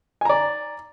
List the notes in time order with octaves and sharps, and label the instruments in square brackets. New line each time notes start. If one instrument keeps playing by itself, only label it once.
[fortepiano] G#5
A#5
D5